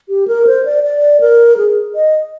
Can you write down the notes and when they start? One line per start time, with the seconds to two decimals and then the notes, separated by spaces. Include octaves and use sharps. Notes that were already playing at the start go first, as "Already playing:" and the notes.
0.09 G4
0.28 A#4
0.47 C5
0.65 D5
0.84 D5
1.21 A#4
1.57 G#4
1.95 D#5